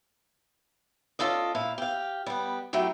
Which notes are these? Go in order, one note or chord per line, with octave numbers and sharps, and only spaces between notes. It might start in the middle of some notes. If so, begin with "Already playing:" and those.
C#4 F4 A4 D5 D#5
A#2 E4 F5
G4 F5
G3 B3
F#3 A3 E4 G4